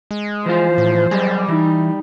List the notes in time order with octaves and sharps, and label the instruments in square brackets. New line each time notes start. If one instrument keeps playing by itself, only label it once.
[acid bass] G#3
[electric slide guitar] E3 F3 F4 [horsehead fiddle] C5
[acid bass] A2
[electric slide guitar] F#3 G4 G#4 [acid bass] G3
[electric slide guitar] E3 [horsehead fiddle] D#4